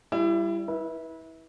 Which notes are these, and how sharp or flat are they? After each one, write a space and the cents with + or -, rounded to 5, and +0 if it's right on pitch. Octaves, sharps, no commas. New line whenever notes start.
G3 +0 E4 +30
E4 -25 B4 -25